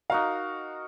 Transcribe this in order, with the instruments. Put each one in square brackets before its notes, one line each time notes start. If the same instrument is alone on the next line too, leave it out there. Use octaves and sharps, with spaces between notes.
[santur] D#4 F#4 A#4 [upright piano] F5